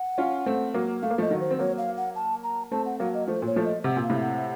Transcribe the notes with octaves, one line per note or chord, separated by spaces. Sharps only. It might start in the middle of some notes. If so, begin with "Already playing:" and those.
Already playing: F#5
C#4 F4
A3 C4
F#3 A#3
A3 F5
A#3
F3 A3 D#5
D#3 F#3
C5
C4
F#3 A#3 C#5
F5
F#5
A5
A#5
A3 C4 A5
F#5
F#3 A#3 F5
D#5
F3 A3 C5
A#2 C#5
F3 A3
D#5
C3 F#5
A#2
F5
A2 C3
F#5